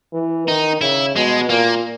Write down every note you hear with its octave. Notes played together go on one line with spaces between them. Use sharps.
E3
D#3 D#4
C#3 E4
B2 G#3
A#2 A#3